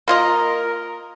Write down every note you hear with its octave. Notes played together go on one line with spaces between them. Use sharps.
A#3 F4 A#4 D#5